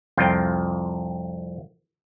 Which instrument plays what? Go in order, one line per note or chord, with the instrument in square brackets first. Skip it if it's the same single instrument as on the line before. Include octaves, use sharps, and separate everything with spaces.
[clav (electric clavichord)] C2 F2 F4 G5